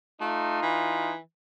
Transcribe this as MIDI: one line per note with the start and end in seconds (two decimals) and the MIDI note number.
0.21 0.59 57
0.21 1.11 63
0.21 1.11 65
0.62 1.18 52